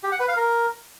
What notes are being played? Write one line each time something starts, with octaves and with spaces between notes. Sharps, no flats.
G4
F#5
B4
F5
A#4